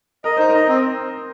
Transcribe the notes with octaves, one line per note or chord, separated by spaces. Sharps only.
A#4 D#5
D#4 C5
A#4 D#5
C4